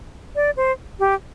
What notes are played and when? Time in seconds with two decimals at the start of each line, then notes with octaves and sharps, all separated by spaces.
0.36 D5
0.57 C5
0.99 G4